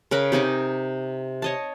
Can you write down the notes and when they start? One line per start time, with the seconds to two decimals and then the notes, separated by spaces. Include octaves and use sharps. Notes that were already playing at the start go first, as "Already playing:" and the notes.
0.11 C#3 A#4 B4 B5
0.32 C3 D#4 G#5 D6
1.42 C#5 D#5 A5